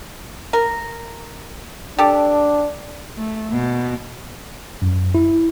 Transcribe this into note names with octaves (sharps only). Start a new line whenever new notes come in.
A#4
D4 G4 A4
A3
B2
F#2
E4